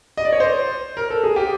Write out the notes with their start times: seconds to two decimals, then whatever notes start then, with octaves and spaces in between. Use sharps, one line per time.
0.17 D#5
0.25 D5
0.32 C#5
0.40 C5
0.97 A#4
1.10 A4
1.24 G#4
1.36 G4